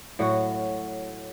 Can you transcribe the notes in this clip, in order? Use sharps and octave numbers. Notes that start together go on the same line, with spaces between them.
A2 F#3 F#4